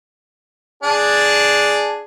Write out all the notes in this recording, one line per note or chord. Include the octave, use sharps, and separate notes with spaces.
D4 G#4